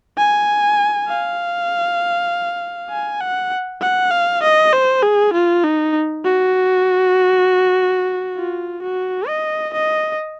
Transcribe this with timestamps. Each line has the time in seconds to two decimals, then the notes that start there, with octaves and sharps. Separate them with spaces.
0.18 G#5
1.09 F5
2.90 G#5
3.21 F#5
3.82 F#5
4.12 F5
4.43 D#5
4.73 C5
5.03 G#4
5.33 F4
5.64 D#4
6.25 F#4
8.37 F4
8.83 F#4
9.28 D#5
9.74 D#5